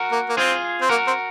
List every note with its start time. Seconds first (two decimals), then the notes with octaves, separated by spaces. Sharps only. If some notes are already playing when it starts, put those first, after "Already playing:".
Already playing: F#4 A#4
0.11 A#3
0.29 A#3
0.37 C4 F4 G#4
0.81 C4
0.89 A#3 F#4 A#4
1.07 C4